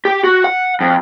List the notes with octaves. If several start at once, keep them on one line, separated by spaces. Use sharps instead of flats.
G4
F#4
F#5
F2